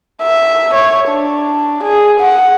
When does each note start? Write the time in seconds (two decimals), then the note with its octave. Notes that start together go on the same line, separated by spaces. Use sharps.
0.22 E5
0.74 C#5
1.09 D4
1.84 G#4
2.21 F#5